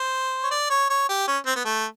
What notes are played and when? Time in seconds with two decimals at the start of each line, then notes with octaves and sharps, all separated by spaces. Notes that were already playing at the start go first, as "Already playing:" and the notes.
Already playing: C5
0.43 C#5
0.51 D5
0.70 C#5
0.90 C#5
1.09 G4
1.28 C#4
1.46 C4
1.55 B3
1.65 A3